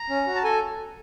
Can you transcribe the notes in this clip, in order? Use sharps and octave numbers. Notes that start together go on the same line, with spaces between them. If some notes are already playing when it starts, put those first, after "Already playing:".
Already playing: A#5
C#4
F#4
A5
A4 G#5